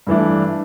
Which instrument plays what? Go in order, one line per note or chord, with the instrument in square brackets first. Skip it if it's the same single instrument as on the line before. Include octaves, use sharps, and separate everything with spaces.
[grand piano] G2 E3 A3 D4